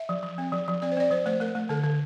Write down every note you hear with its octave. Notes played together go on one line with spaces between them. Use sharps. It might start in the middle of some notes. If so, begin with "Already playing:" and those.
Already playing: E5
F3
F3
C4
F3
F3
C4 D5
C5
C4 D5
F3 C5
A3 C5
A3 A#4
A3
D3 A4
D3